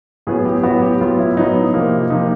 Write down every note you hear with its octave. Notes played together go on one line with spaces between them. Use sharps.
A2 F#3 B3 G#4
G4
A2 F#3 B3 F#4
G4
A2 F#3 B3 F4
E4
A2 F#3 B3 D#4
C3 F3 A#3
C3 F3 A#3 D#4